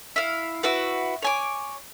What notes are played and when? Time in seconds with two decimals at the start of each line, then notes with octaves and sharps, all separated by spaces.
0.16 E4 F5
0.63 E4 F#4 B4
1.22 C#5 G#5 D6